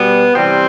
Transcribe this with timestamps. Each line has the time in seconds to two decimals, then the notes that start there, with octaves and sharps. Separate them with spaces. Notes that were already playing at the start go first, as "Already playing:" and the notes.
Already playing: B2 G3 B3
0.35 C3 E3 G3 C4